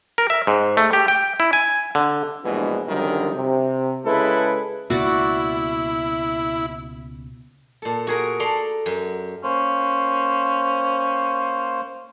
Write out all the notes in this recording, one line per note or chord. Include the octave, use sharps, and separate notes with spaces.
A#4
E5
G#2
A3
G4
G5
E4
G#5
D3
A#1 G2 B2 E3 G#3
F#2 D3 D#3 F3 G3
C3
C#3 G#3 E4 A4 B4
C#2 B2 A#3 E4 F#4 D5
A#2 A4
F#4 G#4 A#4
A4 D5 A#5 C6
F#2
A#3 C#4 C5